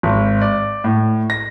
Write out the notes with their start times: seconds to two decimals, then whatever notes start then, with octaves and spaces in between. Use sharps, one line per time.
0.03 G#1
0.42 D5
0.84 A2
1.30 A#6